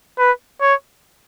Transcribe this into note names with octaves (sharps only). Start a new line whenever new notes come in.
B4
C#5